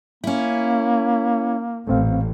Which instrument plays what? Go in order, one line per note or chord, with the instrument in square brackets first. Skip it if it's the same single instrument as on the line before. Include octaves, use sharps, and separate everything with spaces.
[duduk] A#3 [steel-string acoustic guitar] C#4 E4
[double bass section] A1 A#2 [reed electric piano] A3 C4 F5